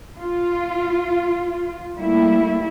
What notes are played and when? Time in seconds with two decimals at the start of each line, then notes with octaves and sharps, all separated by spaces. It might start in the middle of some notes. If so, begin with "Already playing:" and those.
0.20 F4
1.95 G3 A3 A#3 E4